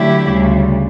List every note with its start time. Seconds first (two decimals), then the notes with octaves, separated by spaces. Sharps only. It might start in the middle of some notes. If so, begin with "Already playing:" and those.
Already playing: D3 F#3 A3 E4 G4
0.27 D2 C#3 G3